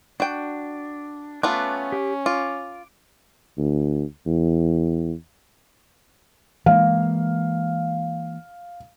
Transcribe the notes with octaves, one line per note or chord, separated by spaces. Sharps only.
D4 F#4 G5
A3 B3 C#4 F4 A5 D6 F#6
G4
F4 D6
D2
E2
E3 G#3 A#3 F5